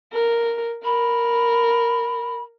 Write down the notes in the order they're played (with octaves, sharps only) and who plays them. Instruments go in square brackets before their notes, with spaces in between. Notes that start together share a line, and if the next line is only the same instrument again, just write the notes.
[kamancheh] A#4
[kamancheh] A#4 [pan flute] B5